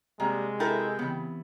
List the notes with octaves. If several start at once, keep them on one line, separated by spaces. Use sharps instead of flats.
C3 G3 G#3 A#3
E4 A4 A#4 G5
C#3 E3 B3